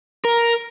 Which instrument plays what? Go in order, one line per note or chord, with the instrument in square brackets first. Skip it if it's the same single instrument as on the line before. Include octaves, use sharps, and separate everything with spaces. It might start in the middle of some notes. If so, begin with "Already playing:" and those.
[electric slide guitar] A#4